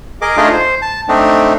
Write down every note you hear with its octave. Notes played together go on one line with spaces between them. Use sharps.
G#4 A#4 D#5 D6
A3 D4 D#4 F4 G#4 D#5
C5
A5
A3 C4 D4 D#4